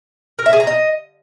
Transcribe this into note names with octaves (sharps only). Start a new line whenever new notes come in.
A#4
E5
G#4
A#5
D#5